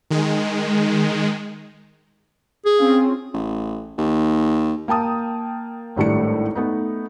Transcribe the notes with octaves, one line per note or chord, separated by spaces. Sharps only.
D#3 G#3
G#4
C4 C#4 F4
A1
D#2
A#3 G5 A5 D#6
G#1 A2 G3 A3 D4 C#7
A3 B3 D#4